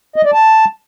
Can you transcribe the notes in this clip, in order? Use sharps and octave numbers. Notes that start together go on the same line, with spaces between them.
D#5
D5
A5